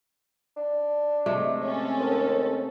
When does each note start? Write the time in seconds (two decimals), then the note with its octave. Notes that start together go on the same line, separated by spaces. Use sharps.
0.57 D4
1.26 C3 G#3 A3
1.61 C4 C#4 A4
2.00 D#2